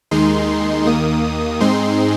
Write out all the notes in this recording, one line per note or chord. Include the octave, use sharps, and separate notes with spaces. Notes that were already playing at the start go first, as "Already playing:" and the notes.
D#2 D#3 G#3 D#4 C6
D#2 D#3 A#3 D#6
G#2 G#3 C4 D#4 C6